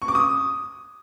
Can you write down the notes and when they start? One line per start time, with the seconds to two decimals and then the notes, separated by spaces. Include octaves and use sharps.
0.02 C#6
0.08 D6
0.15 D#6